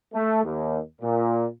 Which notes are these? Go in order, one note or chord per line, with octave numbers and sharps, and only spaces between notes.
A3
D#2
A#2